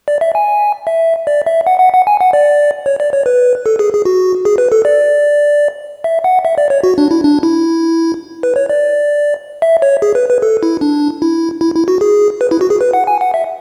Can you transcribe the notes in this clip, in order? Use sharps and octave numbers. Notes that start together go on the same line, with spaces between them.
D5
E5
G#5
E5
D5
E5
F#5
F#5
F#5
G#5
F#5
D5
C#5
D5
C#5
B4
A4
G#4
G#4
F#4
G#4
B4
A4
D5
E5
F#5
E5
D5
C#5
F#4
D4
E4
D4
E4
B4
C#5
D5
E5
C#5
G#4
B4
B4
A4
E4
D4
E4
E4
E4
F#4
G#4
B4
E4
F#4
G#4
B4
F#5
G#5
F#5
E5